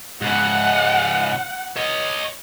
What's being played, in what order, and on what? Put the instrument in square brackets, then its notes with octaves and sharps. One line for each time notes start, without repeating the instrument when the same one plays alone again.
[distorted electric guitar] G#2 C#3 [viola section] F#5
[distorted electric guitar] C#5 D#5